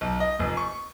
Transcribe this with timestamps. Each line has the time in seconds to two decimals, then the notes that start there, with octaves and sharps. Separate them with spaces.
0.01 B1
0.20 D#5
0.39 F1
0.57 C#6